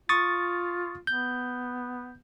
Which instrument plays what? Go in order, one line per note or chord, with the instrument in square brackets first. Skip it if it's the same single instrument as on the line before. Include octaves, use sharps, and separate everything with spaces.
[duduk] F4 [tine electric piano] C#6 D#6 A6
[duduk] B3 [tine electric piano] G6